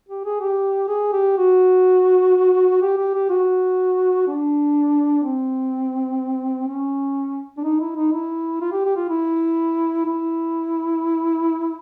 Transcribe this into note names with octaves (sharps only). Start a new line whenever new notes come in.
G4
G#4
G4
G#4
G4
F#4
G4
G4
G4
F#4
D4
C4
C#4
D4
D#4
E4
D#4
E4
F4
G4
G4
F4
E4
E4